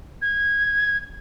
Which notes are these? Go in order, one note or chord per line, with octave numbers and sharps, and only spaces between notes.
G#6